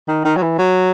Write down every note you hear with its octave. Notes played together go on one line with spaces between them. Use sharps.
D#3
D#3
F#3
E3
F#3